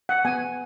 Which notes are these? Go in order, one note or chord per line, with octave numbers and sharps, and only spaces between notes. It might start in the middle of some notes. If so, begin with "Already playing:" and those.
F#5
B3 G#5